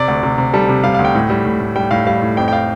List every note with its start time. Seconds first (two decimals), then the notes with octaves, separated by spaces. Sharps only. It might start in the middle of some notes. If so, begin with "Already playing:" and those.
Already playing: C3 D5
0.08 D2
0.23 C3
0.38 C3
0.53 G3 A4
0.69 C3
0.84 G3 F5
0.94 F5
0.99 D2
1.05 G5
1.15 A2
1.30 G3
1.45 A2
1.60 A2
1.76 G3 G5
1.91 A2 F5
2.07 G3 F5
2.22 A2
2.37 F2 G5
2.48 G5
2.53 F5